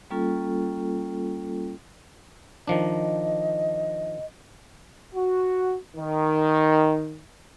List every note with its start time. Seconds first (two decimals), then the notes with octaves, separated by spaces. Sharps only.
0.11 G3 A#3 C#4 F4 A4
2.67 D#3 F3 D4 D#5
5.14 F#4
5.97 D#3